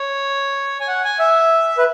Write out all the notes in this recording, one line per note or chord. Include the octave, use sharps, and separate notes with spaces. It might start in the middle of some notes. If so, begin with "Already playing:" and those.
Already playing: C#5
G#5
F#5
G#5
E5
B4